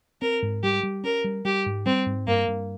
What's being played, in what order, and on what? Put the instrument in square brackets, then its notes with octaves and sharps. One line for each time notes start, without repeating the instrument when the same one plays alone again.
[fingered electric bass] C4 [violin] A#4
[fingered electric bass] G#2
[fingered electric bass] G3 [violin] G4
[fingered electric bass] G3
[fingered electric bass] C#4 [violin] A#4
[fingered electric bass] G3
[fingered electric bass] G3 [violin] G4
[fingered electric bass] G#2
[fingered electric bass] G3 [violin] C4
[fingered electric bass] G#2
[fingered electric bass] G2 [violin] A#3
[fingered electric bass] G2